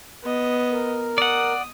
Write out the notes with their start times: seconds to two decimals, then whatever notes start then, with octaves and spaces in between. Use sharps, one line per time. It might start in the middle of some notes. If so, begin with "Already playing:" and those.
0.23 B3 D#5
0.72 A#4
1.18 D5 F#5 D#6